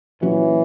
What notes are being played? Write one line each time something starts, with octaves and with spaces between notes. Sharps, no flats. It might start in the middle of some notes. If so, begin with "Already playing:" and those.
A#2 E3 F#3 C#4